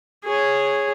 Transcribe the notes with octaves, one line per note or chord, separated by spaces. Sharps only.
G#4 C#5